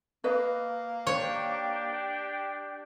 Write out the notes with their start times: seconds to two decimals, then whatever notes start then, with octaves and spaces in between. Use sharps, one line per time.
0.24 A#3 B4 D#5
1.07 D4 G4 C#5 G5